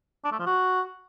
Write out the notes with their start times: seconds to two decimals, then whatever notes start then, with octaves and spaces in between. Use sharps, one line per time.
0.25 D4
0.32 A3
0.39 F3
0.46 F#4